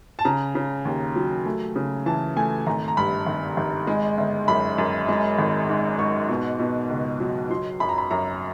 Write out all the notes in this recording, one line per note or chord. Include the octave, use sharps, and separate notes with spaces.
A5
C#3 A#5
C#3
D#2
F#3
A3
C#3
E3 A5
A3 G#5
G#1 A#5
A#5
G2 B5
G#1
G#1
G#3
G1
F#2 B5
F#2
G#3
G#1
G#2
G#2 C#6
B2
B2
C#2
F#3
F#3 C6
F#2 B5
A#5
B5
F#2 A#5